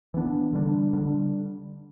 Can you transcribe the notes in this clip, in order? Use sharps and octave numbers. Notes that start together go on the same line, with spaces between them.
E3 B3 D4
D3 G3 D4
D3 G3 D4